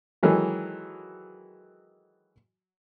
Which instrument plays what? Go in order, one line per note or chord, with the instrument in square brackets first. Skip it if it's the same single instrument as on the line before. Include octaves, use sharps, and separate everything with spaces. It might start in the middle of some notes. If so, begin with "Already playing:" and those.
[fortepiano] D#3 E3 F#3 G#3 A4